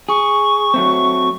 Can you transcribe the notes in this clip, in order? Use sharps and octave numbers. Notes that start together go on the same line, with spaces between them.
G#4 C#6
F#3 A3 C4